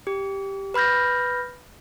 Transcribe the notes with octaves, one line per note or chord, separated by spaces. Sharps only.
G4
B4 B5 F6 G6 A#6